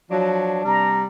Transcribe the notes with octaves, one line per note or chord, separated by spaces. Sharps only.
F3 F#3 D4
C3 G3 A#5